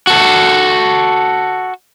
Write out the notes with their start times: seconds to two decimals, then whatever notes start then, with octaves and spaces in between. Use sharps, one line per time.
0.07 F#4 A4